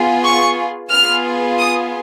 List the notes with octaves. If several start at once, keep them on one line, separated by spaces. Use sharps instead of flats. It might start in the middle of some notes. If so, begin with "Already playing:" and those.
Already playing: B3 F4 G#4
C#6
B3 F4 G#4 F6
D#6